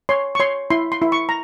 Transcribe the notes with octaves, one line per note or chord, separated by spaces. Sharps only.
C#5 C6
C#6
C#5 C6
E4 C6
C6
E4
C#6
A#5